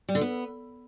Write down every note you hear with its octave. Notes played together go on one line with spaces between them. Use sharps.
G3
D3
B3